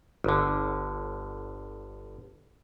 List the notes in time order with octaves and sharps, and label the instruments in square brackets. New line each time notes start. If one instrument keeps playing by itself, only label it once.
[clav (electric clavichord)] G1 D3